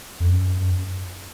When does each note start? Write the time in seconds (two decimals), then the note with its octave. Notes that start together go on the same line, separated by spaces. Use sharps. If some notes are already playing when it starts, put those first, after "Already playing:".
0.20 F2
0.30 F#2